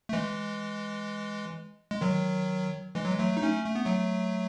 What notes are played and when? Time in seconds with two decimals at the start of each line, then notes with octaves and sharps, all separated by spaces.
0.09 A3
0.13 E3 G#3
1.91 G#3
2.01 D#3 F#3
2.95 E3 G#3
3.05 F#3
3.11 G#3
3.19 F#3 A3
3.37 D#4
3.43 A3 C#4
3.66 A3
3.75 B3
3.86 F#3 A3